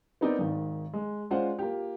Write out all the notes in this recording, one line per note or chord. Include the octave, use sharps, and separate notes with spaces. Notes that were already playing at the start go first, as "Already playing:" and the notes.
B3 C4 D#4 A#4 D5
G#1 D#3
G#3
G#3 C#4 F4 C5 D5 F#5
A#3 F4 G4